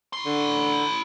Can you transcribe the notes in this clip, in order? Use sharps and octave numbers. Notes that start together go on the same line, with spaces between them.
E4 C6
D3